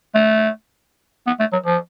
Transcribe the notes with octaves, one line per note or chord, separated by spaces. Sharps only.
A3
B3
A3
F#3
F3